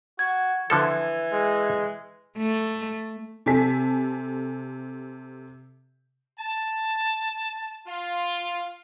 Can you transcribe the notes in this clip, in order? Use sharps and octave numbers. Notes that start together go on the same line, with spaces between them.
F#4 G#6
D3 E3 F3 A4
G#3
A3
C3 A4 G#5 A5 B6
A5
F4